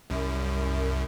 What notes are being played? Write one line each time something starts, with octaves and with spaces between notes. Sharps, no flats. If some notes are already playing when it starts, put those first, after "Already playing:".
C2 F#2